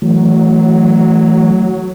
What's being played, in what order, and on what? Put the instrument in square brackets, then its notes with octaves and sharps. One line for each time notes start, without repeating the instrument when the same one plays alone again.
[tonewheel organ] E3 A3 [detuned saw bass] F#3